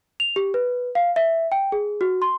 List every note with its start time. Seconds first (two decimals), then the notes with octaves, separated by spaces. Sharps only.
0.20 F7
0.36 G4
0.54 B4
0.95 F5
1.16 E5
1.52 G5
1.72 G#4
2.01 F#4
2.22 C6